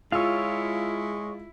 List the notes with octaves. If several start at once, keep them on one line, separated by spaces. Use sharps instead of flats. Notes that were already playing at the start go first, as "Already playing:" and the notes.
G#3 E4 F4 C#5 F5 E6